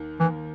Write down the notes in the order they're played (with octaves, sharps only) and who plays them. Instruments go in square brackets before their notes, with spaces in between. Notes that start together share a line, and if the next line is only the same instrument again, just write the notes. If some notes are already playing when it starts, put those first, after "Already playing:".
Already playing: [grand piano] D#2 D#3 A#3
[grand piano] D#2 D#3 A#3 [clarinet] E3